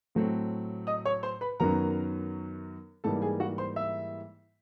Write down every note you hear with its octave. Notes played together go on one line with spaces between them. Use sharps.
A2 F#3 A3 C4
D#5 D#6
C#5 C#6
C5 C6
B4 B5
F#2 D#3 F#3 B3 A#4 A#5
G#2 E3 G3 A#3 A4 A5
G#4 G#5
F#4 F#5
C5 C6
E5 E6